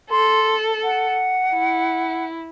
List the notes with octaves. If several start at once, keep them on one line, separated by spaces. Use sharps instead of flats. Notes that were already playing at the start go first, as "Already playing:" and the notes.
A4 C6
F#5
E4